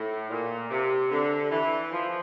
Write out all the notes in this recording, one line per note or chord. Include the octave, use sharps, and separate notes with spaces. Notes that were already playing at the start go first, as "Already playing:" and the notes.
Already playing: A2
A#2
C3
D3
E3
F3